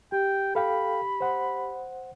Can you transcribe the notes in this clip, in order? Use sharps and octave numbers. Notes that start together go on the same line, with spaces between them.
G4 G5
A4 F5 G5 B5
C5 F#5